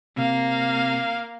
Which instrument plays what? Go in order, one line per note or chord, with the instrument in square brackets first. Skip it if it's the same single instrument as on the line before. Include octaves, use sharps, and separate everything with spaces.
[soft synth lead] C3 [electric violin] A#3 F5